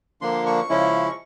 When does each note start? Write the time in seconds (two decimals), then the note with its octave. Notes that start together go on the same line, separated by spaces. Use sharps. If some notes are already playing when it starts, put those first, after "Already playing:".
0.22 D3 F3 A#3 D4 C6
0.46 C#6
0.70 C#3 F3 G#3 C#4 E4